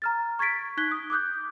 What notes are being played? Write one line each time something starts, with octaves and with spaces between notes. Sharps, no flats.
A#5 F6 A6
C#6 G#6 A6 B6 D7
D#4 F#6 G#6 B6 G7
D#6
D6 D#6 F#6 G6